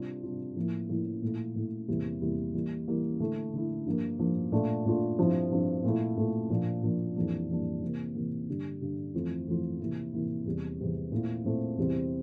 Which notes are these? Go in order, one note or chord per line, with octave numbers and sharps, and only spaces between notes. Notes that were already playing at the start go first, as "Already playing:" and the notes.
Already playing: C3 G3 D4 F4
C3 G3 D4 F4
A2 F3 A#3 E4
A2 F3 A#3 E4
A#2 A3 E4
A#2 A3 E4
E2 C3 G3 A#3 E4
E2 C3 G3 A#3 E4
E3 G3 A#3 E4
E3 G3 A#3 E4
D3 A3 E4
D3 A3 E4
G2 F3 A#3
G2 F3 A#3
A#2 A3 D4 F4
A#2 A3 D4 F4
G2 F3 C4 E4
G2 F3 C4 E4
A#2 A3 E4
A#2 A3 E4
A#2 F3 A#3 D4
A#2 F3 A#3 D4
F2 E3 G3 A#3 D4
F2 E3 G3 A#3 D4
C3 E3 A#3
C3 E3 A#3
G2 D3 G3
G2 D3 G3
F2 E3 A3 C4 F4
F2 E3 A3 C4 F4
C3 E3 A#3 E4
C3 E3 A#3 E4
E2 C3 G3
E2 C3 G3
A#2 A3 C4 E4
A#2 A3 C4 E4
E2 C3 G3 C4 E4